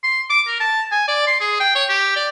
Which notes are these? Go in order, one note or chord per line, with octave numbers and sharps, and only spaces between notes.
C6
D6
A#4
A5
G#5
D5
C6
G#4
G5
C#5
G4
D5